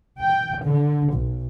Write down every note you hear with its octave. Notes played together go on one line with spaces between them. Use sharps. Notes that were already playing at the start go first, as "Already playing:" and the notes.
G5
D3
B1